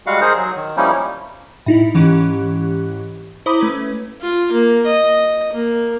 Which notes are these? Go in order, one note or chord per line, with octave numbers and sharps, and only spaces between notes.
G3 G#3 F#4 F5 F#5
D#4 G#4 A#4 C5
F#3
D#3
F3 G3 A#3 C#4 D#4 E4
A2 D#4 E4
G#2 E3 C#4 G4 C#6 F#6
E4 C5 A#5 B5 D6 D#6
A3 C#4 B4
F4
A#3
D#5
A#3